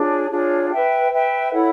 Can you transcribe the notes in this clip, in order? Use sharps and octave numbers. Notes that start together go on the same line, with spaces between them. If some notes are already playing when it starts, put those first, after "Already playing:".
Already playing: D4 F4 G#4 C#5
D4 F4 G#4 C#5
B4 E5 G5
B4 E5 G5
E4 A4 C#5 F#5